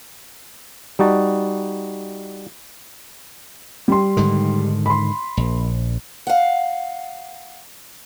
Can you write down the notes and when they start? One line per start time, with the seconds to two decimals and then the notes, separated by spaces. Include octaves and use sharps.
0.99 G3 D#4 F#4 A5
3.88 G3 C6
4.17 G#2 D3 D#3
4.86 B5 C6
5.37 A#1
6.27 F5 F#5